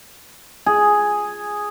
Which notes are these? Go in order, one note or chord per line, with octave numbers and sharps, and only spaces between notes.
G#4